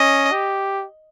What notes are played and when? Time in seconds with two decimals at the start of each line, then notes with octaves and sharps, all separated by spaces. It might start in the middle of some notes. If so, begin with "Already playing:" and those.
Already playing: C#4 D#5
0.32 G4